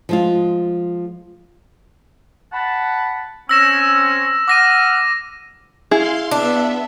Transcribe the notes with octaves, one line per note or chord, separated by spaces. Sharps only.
F3 G#3 F4
F#5 A5 B5
C4 C#4 E6 A#6 E7
F#5 D6 F6 A#6 D#7
E4 G#4 F5 C6
B3 D4 E5